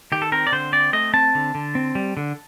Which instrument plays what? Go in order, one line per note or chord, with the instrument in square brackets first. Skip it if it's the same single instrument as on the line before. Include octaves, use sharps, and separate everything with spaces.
[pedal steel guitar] D#3 G4
A4
C4 A#4
D5
D3 C5
C4 D5
A3 D#5
C4 A5
D3
D3
C4
G3
D3